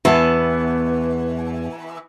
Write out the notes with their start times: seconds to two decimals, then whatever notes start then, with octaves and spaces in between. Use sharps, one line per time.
0.05 E2 E3 B3 A5